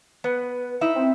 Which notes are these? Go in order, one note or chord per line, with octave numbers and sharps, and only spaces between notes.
B3 B4
D#4 E4 E5
C4